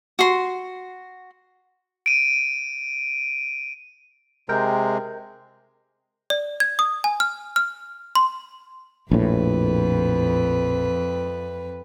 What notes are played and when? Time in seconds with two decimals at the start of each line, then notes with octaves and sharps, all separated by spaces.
0.19 F#4 C6
2.06 D7 D#7
4.49 C3 G#3 A#4 G5
6.30 D5
6.60 G#6
6.79 D#6
7.04 G#5
7.20 F6
7.56 F6
8.15 C6
9.11 A#1 F2 A2 B4